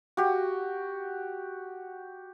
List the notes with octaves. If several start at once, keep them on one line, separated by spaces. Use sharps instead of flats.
F#4 G4